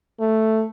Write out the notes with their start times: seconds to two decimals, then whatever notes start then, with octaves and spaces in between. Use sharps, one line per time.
0.20 A3